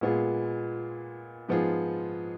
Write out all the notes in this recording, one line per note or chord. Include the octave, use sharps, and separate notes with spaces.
A#2 G#3 B3 F4 G#4
G#2 F3 B3 F4 G#4